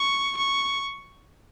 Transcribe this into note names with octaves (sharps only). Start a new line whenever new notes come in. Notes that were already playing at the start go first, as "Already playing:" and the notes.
Already playing: C#6
C#6